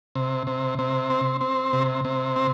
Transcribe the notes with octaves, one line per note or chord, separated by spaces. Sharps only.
C3
C3
C3
C4
C4
C3
C3
C4